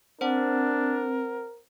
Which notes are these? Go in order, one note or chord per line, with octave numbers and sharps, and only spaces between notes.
C4 D4 A#4 C5 F#5